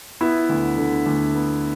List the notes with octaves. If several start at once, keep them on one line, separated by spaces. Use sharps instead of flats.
B3 E4
D2
D3
D2
B3